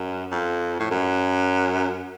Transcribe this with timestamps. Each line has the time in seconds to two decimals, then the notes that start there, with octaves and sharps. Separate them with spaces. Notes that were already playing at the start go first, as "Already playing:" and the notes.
Already playing: F#2
0.32 F2
0.80 A2
0.91 F#2